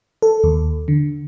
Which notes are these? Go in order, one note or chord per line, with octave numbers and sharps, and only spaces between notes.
A4
D#2
D3